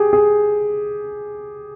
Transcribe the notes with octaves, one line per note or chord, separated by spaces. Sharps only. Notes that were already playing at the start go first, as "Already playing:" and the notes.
Already playing: G4 G#4
G#4